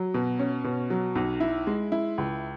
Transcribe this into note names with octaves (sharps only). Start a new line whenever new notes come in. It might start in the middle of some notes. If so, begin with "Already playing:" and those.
Already playing: F#3
B2
C#4
B2
F#3
B1
E4
G#3
E4
C#2